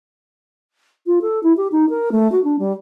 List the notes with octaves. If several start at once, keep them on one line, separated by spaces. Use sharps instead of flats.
F4
A4
E4
G4
D#4
A#4
A3
F#4
D4
G3